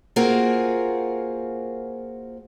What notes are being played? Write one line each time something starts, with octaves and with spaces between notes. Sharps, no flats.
A#3 C4 F4 F#4 G#4 A#4